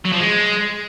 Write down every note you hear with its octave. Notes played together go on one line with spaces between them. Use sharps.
F#3
F3
G#3